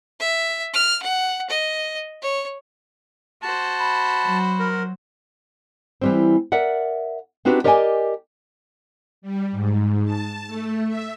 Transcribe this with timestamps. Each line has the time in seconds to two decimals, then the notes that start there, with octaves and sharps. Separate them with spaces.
0.20 E5
0.74 F6
1.03 F#5
1.50 D#5
2.23 C#5
3.43 F#4 C5 A5
3.79 B5
4.25 F#3
4.59 A#4
6.01 E3 G3 C4
6.52 A#4 D5 E5 F#5
7.45 C4 D4 D#4 F#4 G4 B4
7.64 G4 A#4 D5 D#5 F#5 G#5
9.22 G3
9.51 G#2
10.05 A5
10.47 A3
10.86 E5